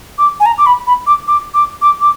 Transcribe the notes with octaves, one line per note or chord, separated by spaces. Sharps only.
D6
G#5
A#5
D6
B5
B5
D6
D6
D6
D6
D6